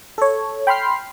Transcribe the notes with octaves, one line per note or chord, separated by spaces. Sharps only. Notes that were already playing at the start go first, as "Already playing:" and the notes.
A4 C#5
G5 B5 C6 F6 C7